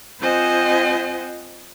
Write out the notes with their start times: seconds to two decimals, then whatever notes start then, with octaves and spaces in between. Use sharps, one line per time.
0.19 C4 F4 C5 D#5 F#5 G#5